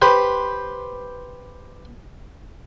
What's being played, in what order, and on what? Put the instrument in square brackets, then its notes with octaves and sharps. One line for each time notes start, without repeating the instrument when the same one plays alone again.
[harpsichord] G4 B4 C5